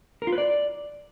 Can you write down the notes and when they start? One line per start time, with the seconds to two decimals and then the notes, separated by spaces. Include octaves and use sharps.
0.22 A#4
0.27 F4
0.32 B4
0.38 D5